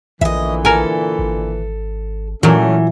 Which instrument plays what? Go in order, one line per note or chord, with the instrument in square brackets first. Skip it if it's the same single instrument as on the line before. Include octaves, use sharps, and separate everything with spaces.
[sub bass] A#1 [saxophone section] A#2 D3 E3 [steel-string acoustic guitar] D#5 E5
[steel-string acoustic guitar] A4 [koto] A#4 G#5
[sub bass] G#1
[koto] A#2 F#3 [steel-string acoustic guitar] E3 [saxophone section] A3 A#3 C#4